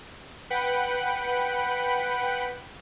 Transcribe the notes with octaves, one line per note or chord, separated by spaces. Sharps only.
B4 F#5 G5 B5